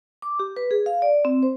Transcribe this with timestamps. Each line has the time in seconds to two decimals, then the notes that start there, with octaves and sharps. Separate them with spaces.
0.22 D6
0.39 G4
0.57 B4
0.71 G#4
0.86 F5
1.02 D5
1.25 C4
1.43 C5